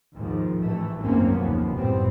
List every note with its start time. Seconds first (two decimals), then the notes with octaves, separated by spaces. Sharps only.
0.15 D#2 G#2 D#3 F3
0.61 A1 E3 A3
0.99 G#1 C#2 F#2 A#3 C4 C#4
1.33 F#1 D#2 C3 F3 B3
1.74 F#1 F#2 A2 G3 B3 C4